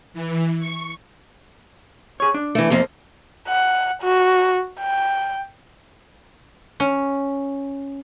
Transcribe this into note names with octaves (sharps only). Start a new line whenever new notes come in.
E3
C#6
G#4 C#5
D4
E3 A3
F2 F3 A#3
F#5
F#4
G5
C#4